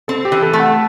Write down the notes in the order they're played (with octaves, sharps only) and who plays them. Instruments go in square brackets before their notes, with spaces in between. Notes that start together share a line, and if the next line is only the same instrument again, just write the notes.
[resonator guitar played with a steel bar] C4 [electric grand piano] A4
[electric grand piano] G4
[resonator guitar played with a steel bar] E3
[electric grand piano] A4
[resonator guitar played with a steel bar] A3
[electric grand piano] F#5